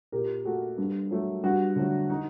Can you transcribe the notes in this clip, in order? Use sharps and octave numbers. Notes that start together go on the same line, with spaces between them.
A#2 G4 A#4
A3 F#4 A4
G2
F#3 A3
G2 F#4
D3 F#3 A3
D#4